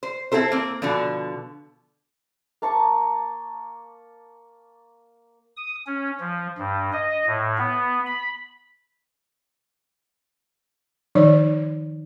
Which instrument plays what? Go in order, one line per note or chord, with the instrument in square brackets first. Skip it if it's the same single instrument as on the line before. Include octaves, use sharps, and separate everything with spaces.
[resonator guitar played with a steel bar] C5
C4 E4 G4 A4 C5
A#3 C4
B2 D3 F3
[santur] A#3 A5 C#6 D6
[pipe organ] D#6
C#4
F3
G2
D#5
A2
B3
B5
[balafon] D#3 F3 D#4 C#5 D5